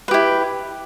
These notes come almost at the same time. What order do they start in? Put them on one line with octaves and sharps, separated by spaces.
B4 G4 E4